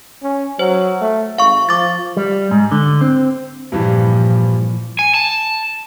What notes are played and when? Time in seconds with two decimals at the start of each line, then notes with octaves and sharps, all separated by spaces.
0.23 C#4
0.59 F#3 C5
1.01 A3
1.38 G#1 F5 C#6
1.69 F3 D6 A6
2.17 G3
2.51 G#2
2.72 D3
3.01 C4
3.72 G2 A#2 E3 F3 G3
4.99 G#5
5.14 A5